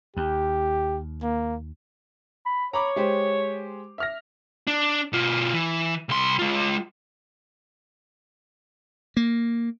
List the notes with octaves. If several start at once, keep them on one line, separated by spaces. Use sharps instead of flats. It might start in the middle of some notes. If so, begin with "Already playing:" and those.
D#2 G4
A#3
B5
C#5 A#5 B5 D6
G#3 G4 C5
E5 F6 A#6
D4
B2 F4
E3
C2 C6
G#3 F4
A#3